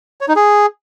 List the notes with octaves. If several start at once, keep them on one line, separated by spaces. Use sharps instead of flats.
C#5
D#4
G#4